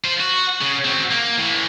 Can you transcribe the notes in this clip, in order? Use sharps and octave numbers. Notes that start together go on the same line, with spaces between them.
F4 C5
F#4
C#3
C4 F#4
A#3
A2 E3